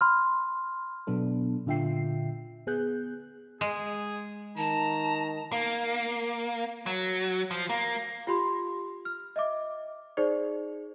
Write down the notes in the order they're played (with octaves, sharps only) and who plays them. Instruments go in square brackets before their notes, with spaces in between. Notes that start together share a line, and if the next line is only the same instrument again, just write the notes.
[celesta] B5 C6 F6
[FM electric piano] B2 F#3 B3 D4 A4
A#2 D3 F4 E5 G5 C7
B3 G#4 F#6 G6
[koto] G#3 [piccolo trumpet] G#4
[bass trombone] D#3 [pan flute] A5 [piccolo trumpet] A#5
[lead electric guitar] A#3
F#3
F3
A#3
[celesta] F4 G4 B5 C6
F6
D#5 E5 D6
D#4 G#4 C5 D5